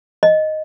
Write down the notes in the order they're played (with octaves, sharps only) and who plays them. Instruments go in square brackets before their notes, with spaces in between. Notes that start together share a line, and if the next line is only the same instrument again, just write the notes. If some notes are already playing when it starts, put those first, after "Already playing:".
[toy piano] D#5